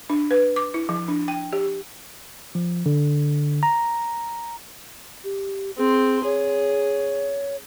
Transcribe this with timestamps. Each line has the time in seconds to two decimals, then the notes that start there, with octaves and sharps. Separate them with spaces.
0.10 D4
0.31 B4
0.56 D6
0.74 E4
0.89 F3
1.08 D4
1.28 G5
1.53 G4
2.55 F3
2.86 D3
3.63 A#5
5.24 G4
5.77 C4 G#4 C6
6.24 G#4 C#5